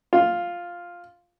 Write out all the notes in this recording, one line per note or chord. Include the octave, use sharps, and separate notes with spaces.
F4